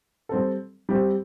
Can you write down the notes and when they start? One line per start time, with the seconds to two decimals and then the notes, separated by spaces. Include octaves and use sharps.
0.29 G3 C4 A4
0.89 G3 C4 G4